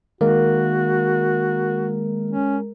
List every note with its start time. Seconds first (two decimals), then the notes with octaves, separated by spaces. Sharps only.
0.21 D#3 G#3 A#3 F#4 A#4
2.31 C#4